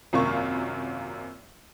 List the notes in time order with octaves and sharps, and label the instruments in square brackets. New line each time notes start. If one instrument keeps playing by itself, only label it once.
[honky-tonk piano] G#1 F#2 C3 A#3 F4 C#6